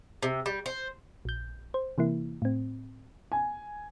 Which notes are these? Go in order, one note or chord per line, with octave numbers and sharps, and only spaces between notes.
C3
G3
C5
A#1 G6
C5
C3 E3 A#3 E4
A2 C4
G#5